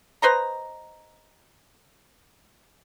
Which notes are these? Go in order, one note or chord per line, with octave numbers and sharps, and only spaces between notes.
B4 C5 D#5 A#5